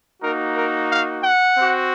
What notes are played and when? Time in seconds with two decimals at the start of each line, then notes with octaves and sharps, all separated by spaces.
0.21 A#3 D#4 F#4 A#4
0.55 A#4
0.89 F5
1.23 F#5
1.57 C4 F#4